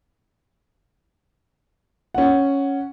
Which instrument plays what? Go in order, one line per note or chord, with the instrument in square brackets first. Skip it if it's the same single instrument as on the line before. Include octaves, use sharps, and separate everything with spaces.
[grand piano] C#4 F#5